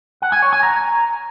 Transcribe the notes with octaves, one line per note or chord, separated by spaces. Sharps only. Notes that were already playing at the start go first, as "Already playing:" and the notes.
F#5
G#5
C#5
G#5
A#5